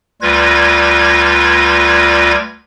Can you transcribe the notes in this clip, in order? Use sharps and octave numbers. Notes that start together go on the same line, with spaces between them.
D2 G3 F4 B4 G#6 A#6